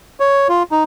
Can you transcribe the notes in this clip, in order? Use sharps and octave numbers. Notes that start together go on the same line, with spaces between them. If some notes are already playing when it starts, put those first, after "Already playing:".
C#5
F4
D#4